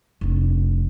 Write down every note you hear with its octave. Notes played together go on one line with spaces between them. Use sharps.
F1 D4